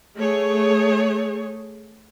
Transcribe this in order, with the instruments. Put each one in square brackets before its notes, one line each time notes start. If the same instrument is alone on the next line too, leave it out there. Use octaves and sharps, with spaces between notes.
[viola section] A3 G#4 C#5